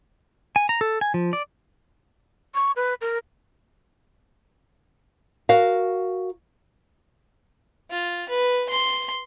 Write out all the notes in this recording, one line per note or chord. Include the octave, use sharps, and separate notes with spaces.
G#5
A#5
A4
G#5
F3
D5
C#6
B4
A#4
F#4 A#4 F5
F4
B4
C6